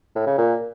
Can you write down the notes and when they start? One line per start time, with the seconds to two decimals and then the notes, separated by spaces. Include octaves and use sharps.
0.15 A2
0.26 C#3
0.38 A#2